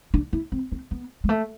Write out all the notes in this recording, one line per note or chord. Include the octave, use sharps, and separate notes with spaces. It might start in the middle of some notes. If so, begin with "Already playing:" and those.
D4
E4
C4
C4
B3
G#3
A3